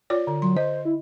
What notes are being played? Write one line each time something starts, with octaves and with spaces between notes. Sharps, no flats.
F4 C#5 D5
D3
F#3 C6
C5 D#5
E4